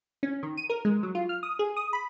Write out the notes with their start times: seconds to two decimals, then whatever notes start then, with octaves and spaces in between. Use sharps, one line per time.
0.23 C#4
0.43 D#3
0.57 D#7
0.70 A#4
0.85 G#3
1.03 F#3
1.15 F4
1.29 F6
1.43 D#6
1.59 G#4
1.77 D#6
1.93 B5